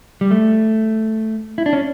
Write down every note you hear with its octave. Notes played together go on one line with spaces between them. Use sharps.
G3
A3
E4
D4
C#4